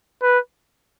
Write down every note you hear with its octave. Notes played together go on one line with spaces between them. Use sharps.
B4